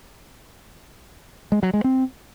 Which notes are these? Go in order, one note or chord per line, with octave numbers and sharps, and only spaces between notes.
G#3
F#3
G#3
C4